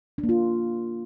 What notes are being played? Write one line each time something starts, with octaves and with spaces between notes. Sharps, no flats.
D4
A#3
F4